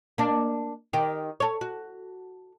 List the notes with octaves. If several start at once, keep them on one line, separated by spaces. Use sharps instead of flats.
A#3 D4
D#3 G4
A4 C#5
F#4